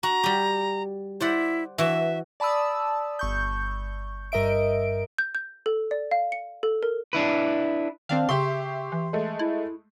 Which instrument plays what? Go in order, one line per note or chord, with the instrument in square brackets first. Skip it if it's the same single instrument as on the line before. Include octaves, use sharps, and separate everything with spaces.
[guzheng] F#4 [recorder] A#5
[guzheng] G3 G4
[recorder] E4 [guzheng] C5 D5 F#5
[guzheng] E3 F#4 [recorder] E5
[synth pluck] D5 A5 B5 D#6 E6
G1 C#6 G6
G2 A#4 D#5 E5 D7
[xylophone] G6
G6
A4
D5
F5
C#7
A4
A#4
[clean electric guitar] D4 E4 B4
[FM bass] D#3 [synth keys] C4 D4 F5
[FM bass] C#3 [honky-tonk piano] G4 E5 C#6 [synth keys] C6
[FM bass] E3
[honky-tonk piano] G#3 A3
[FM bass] E4